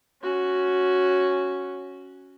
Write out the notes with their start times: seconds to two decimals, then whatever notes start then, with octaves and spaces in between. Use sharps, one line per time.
0.22 C#4 F#4